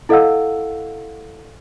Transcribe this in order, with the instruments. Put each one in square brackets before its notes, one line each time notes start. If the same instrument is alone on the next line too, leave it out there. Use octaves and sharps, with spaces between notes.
[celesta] E4 A4 D#5 F5 F#5 E6